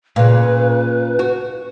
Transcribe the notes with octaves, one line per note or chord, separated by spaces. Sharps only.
A#2 C#3 B4
F#4